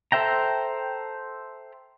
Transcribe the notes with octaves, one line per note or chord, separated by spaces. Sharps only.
A4 C5 E5 G5 A#5